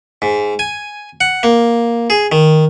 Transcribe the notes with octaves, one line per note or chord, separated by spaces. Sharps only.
G#2
G#5
F#5
A#3
G#4
D#3